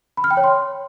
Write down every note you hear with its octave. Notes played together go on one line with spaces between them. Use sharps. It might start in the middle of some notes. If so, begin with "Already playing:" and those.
B5
F6
G5
C#5
C6